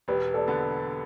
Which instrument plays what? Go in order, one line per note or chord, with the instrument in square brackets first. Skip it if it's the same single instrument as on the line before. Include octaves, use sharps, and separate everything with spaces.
[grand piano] E1 [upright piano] G4 B4
[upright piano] A4 D5
[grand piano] D3 B3